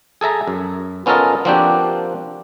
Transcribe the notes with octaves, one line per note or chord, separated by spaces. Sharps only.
G#4 A4 E5 A#5
F#2
B3 C#4 F4 A4 A#4 D#5
F3 A#3 C4 D4 F#4 G4